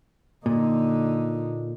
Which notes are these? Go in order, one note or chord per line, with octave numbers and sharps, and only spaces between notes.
A#2 D3 D#4